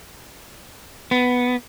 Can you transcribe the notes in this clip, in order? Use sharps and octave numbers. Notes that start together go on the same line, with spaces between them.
B3